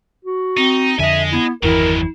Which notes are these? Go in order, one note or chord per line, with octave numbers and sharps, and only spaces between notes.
F#4
C4 D#4
F2 D3 D#5 E5 G#5
B3 E4
G1 E2 D#3 E3 F#3 E4 A#4